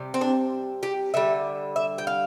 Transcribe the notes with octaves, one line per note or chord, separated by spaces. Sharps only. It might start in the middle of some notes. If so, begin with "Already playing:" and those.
Already playing: C3 G3
C4
D4
G4
D3 G3 E5
E5
G5
F5